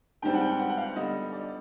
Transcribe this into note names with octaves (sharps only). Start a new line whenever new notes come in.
G#2 D#3 G3 C4 G5
F#5
G5
F#5
F#5
F5
D3 G3 B3 D#5
D5